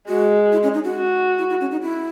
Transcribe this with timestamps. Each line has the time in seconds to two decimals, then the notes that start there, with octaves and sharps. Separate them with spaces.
0.08 G#3 F#4
0.52 E4
0.63 C#4
0.74 D#4
0.84 F#4
0.96 F#4
1.39 E4
1.50 E4
1.61 C#4
1.71 D#4
1.82 E4